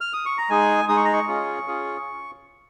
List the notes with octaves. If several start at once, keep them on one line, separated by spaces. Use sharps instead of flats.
F6
D#6
C#6
A#5
G#3 D#4 G#4 G#5
G#3 D#4 G#4 D#6
C#6
A#5
C#6
C#4 F4 G#4
C#4 F4 G#4